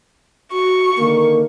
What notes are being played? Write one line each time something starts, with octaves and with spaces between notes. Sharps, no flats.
F#4 C#6
D3 D#3 A#3 A#4